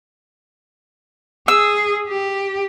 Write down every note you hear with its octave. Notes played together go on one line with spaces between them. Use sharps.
G#4 E6
G4